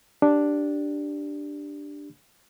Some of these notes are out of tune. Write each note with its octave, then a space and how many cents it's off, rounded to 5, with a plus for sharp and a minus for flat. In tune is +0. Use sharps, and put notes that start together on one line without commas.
D4 +0 G4 +0